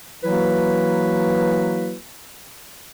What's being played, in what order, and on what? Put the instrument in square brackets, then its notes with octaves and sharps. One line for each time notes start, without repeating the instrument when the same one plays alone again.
[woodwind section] E3 F#3 A#3 E4 F#4 B4